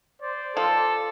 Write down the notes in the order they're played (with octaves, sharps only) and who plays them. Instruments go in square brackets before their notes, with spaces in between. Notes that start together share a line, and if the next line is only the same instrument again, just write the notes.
[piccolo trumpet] C5 [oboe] D5
[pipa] F3 [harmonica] A4 [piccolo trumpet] A5